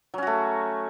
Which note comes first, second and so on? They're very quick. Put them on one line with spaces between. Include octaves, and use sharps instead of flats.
F#3 C#4 F#4 A3